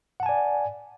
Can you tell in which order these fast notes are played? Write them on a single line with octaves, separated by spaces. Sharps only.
F#5 A5 G#5 D5